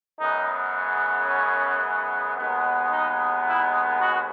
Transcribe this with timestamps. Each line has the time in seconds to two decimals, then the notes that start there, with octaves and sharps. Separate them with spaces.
0.20 F#2 C#3 G#3 B3 D#4
1.28 C#4
2.37 D#2 D#3 G#3 B3
2.91 D#4
3.46 E4
4.00 F#4